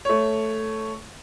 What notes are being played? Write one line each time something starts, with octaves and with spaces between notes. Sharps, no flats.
A3 C#5